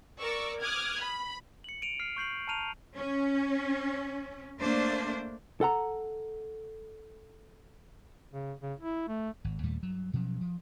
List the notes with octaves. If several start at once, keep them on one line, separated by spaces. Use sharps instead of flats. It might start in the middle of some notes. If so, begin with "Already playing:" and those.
A#4 D5 C#6 D6 E6
D6 D#6 F6 F#6 G#6
B5
C#7 F#7
D7 D#7 F7
F6 C7
C#6 G6 C7 F#7
A5 A#5 F6 D#7 F7
C#4
A3 A#3 D4 C5
A4 F#5 A#5
C#3
C#3
E4
A3
G#1
D#2 A#2 G3 A3
G2 F#3
B2 F3 F#3 C#4
F3